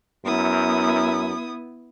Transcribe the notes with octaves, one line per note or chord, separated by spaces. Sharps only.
F#2 B3 E4 D#6